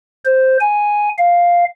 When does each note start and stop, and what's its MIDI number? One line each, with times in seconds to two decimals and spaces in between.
0.25 0.57 72
0.60 1.09 80
1.18 1.65 77